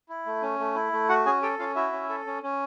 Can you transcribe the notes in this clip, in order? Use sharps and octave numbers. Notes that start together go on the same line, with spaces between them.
E4
A3
C#4
A3
E4
A3
F#4 F#5
C#4 G#4 G#5
G4 A4 G5
C#4 F4 F5
E4 F#4 E5
C#4
A4
C#4
C#4